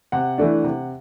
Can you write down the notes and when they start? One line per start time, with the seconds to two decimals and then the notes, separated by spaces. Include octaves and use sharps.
0.12 C3 F#5
0.38 E3 A3 D4
0.64 C3